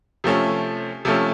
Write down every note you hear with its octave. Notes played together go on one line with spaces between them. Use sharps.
C3 F3 A3 C#4
C3 F3 A3 C#4